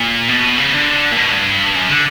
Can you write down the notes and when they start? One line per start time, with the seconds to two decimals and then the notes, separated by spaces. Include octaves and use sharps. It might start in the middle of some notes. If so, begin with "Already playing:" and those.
Already playing: A#2
0.28 B2
0.58 C#3
0.73 D3
1.12 A#2
1.17 B2
1.31 G2
1.75 F#2
1.89 D3